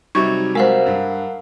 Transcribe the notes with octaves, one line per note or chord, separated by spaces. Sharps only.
C3 F#3 G3 D#4 C#6 G#6
G#3 A#4 C5 F5 F#5
G2